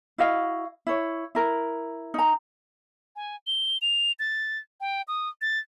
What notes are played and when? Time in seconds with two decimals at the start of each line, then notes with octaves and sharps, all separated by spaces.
0.18 E4 F#4 D#5 F5
0.87 E4 C#5
1.35 E4 A#4
2.14 D#4 A#5
3.16 G#5
3.47 G7
3.82 F7
4.19 A6
4.81 G5
5.08 D#6
5.42 A6